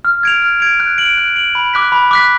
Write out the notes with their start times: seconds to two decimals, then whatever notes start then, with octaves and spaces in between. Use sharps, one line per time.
0.05 F6
0.23 G#6 D7 F7
0.42 F6
0.60 G#6 D7 F7
0.80 F#6
0.98 D7 F#7
1.17 F#6
1.36 D7 F#7
1.55 B5
1.73 D6 F#6 B6
1.92 B5
2.11 D6 F#6 B6